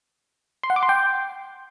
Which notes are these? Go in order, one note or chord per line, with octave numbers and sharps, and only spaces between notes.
C6
F#5
D6
C6
G5